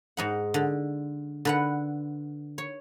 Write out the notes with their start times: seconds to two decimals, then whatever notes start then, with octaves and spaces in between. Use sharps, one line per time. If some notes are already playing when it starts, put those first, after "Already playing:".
0.17 G#2 D#4 F#5
0.54 D3
1.45 D3 B4 F#5
2.58 C#5